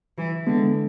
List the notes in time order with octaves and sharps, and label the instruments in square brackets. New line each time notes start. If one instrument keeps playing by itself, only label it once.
[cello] E3
[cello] D3 [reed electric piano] G#3 B3